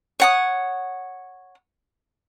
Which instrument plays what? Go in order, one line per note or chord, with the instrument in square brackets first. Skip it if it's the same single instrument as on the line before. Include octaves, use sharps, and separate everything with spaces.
[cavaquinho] C#5 F#5 D#6